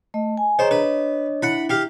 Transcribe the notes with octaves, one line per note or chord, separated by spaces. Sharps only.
A3 D#5
G#5
G#4 C5 C#5 D#5 A#5
D4 B4
E4 F#5 B5
G4 F5